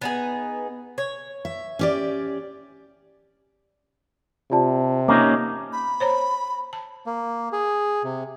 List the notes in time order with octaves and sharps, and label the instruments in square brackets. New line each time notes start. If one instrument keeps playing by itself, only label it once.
[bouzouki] B3 D#4 G#4
C#5
[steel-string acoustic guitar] E5
C#4 G4 D5
[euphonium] C3 [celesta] F4 D5 A5
[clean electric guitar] A#3 C#4 D#4 [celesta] A#5 D6
[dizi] B5
[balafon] C5 C#5 A#5
A5
[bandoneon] A#3
G#4
C3